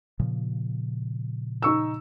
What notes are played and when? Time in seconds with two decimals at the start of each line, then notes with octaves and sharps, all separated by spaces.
0.20 A#2 C#3 F3
1.62 D#4 C#6 E6